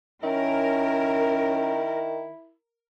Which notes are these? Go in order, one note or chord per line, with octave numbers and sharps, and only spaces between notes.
D#3 C#4 E4 A#4